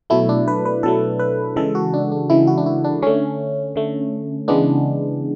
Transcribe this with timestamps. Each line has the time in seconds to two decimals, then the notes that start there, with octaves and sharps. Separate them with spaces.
0.10 B2 F#3 A3 E4
0.29 D4
0.48 B4
0.65 B4
0.83 B2 F#3 A3 A4
1.19 B4
1.56 C#3 E3 G#3 A4
1.75 F#4
1.94 D4
2.12 D4
2.29 C#3 E3 G#3 E4
2.47 F#4
2.58 D4
2.66 E4
2.84 D4
3.02 D3 A3 C#4
3.76 D3 A3
4.48 C#3 E3 G#3 B3 D4